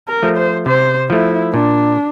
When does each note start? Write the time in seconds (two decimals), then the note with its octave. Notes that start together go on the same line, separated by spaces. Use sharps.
0.08 A#4
0.23 F3 A3
0.37 C5
0.66 C3 C5
1.10 F3 A3 E4
1.54 A#2 D4